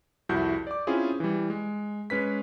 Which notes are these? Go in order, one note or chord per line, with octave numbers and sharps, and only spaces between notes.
C2 F2 E4 F#4 G6
D5 D6
C4 C#4 E4 F4 G#4
E3 G3
G#3
G#3 C#4 B4 B6